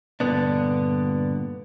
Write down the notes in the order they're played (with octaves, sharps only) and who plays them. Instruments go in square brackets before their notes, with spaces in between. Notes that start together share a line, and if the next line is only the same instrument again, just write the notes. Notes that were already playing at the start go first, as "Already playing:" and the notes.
[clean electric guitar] G2 A#2 D3 B3 D4